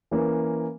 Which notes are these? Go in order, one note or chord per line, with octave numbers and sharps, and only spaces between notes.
E3 A#3 C#4